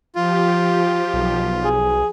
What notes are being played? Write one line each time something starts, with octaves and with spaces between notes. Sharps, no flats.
F3 F4 G4
B1
G#4